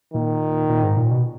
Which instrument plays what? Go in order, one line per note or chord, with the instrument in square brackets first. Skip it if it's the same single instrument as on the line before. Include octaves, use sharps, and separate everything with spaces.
[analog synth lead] A#2 [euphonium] D#3
[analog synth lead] A#2
G#2
A#2
B2